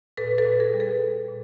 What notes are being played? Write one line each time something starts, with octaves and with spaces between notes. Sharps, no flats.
A#2 A4 B4
A4 B4
A#2
G#4 A#4
G3
A4 B4
G3
A#2